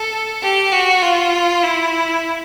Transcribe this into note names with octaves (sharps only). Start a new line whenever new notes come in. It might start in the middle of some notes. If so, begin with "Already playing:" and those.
Already playing: A4
G4
F#4
F4
E4